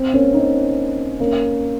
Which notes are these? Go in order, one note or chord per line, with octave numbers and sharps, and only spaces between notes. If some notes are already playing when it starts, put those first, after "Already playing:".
Already playing: C4
A#3 C#4
C4 D#4
A#3 C#4